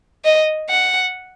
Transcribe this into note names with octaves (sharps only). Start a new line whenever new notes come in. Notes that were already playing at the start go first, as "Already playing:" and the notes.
D#5
F#5